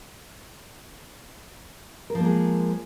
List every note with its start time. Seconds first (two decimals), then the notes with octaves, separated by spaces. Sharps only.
2.10 A#4
2.15 F3
2.20 A#3
2.25 G#3